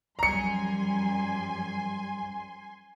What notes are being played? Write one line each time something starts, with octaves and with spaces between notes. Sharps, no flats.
F#2 F3 G3 G#5 A#5 C6 C#7